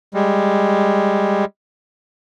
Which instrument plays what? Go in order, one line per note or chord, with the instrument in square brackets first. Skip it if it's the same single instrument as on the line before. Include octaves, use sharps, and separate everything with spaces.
[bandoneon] G3 G#3